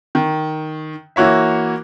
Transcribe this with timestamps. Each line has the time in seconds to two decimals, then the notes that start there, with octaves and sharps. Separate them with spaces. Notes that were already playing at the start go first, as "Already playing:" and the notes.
0.15 D#3
1.16 E3 A#3 F#4 C#5 E5